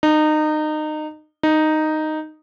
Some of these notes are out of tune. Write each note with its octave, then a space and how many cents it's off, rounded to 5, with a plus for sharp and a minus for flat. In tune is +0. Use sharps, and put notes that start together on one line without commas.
D#4 -25
D#4 -5